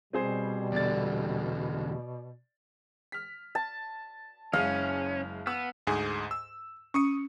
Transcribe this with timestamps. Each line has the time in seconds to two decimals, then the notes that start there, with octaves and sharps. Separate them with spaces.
0.13 B2 G3 C4 G#4 C5
0.72 E2 D3 D5 A6
3.12 F6 B6
3.55 A5
4.53 F#1 G#3 C#4 E5 F5
5.47 B3 E6
5.87 D2 G#2 G#4
6.31 E6
6.94 C#4 C#6 D#6 C#7